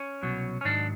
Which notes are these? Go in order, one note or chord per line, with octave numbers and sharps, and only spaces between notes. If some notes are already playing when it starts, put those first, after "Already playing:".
Already playing: C#4
C2 B2 F#3
C#4
G#2 D#3 F#3 D4